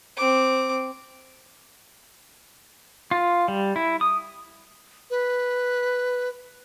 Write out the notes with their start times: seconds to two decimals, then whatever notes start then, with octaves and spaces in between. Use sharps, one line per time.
0.17 C4 D6
3.11 F4
3.48 G3
3.76 E4
4.01 D#6
5.10 B4